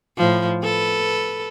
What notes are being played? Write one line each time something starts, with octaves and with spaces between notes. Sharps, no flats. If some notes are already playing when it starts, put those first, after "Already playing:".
A2 F3
A4 B4